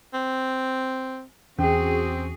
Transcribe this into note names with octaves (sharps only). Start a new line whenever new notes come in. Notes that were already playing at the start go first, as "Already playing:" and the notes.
C4
E2 C4 C#4 F#4 G#4